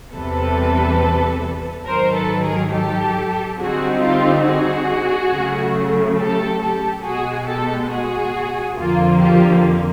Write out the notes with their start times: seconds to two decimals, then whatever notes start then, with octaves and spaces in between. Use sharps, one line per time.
0.14 E2 C3 E3 G3 A4 B4
1.87 G#2 D#3 F#3 A#4 C5
2.16 A4 B4
2.44 G#4 A#4
2.73 G4 A4
3.59 D3 G3 C4 D#4 F#4 G#4
4.02 F4 G4
4.46 F#4 G#4
5.32 C#3 F#3 A3
6.18 G4 A4
6.62 G4 A4
7.05 B2 G#3 B3 F#4 G#4
7.48 G4 A4
7.91 F#4 G#4
8.78 F2 D3 F3 A#3 F4
9.20 F4 G4